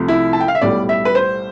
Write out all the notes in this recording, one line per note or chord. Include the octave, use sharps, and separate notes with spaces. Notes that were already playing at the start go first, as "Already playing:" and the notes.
Already playing: C2 C3 F3 A3
E4
A5
G5
F5
E5
B1 A2 G3 D5
E5
B4
C5